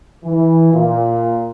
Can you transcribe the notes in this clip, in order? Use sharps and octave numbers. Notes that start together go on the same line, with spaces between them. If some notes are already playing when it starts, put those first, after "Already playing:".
E3
A#2